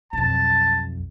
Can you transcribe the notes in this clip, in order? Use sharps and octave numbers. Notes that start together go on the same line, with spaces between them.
B1 F2 A5